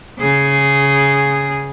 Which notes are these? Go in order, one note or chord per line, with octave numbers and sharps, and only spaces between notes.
C#3 G#4